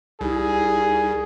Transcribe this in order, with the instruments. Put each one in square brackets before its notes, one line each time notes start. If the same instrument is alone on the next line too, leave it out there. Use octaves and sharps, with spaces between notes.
[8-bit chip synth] C2 [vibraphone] D#4 E4 G4 [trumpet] G#4